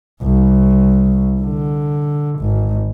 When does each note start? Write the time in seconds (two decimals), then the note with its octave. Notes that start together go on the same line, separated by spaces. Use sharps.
0.23 C2
1.41 D3
2.40 G#1